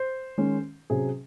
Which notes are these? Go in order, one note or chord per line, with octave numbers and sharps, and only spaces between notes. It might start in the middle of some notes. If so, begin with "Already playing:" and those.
Already playing: C5
D#3 G#3 C#4
C3 F#3 C#4 G#4